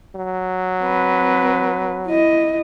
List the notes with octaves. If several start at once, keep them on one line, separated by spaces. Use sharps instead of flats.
F#3
C4 B4
E4 D#5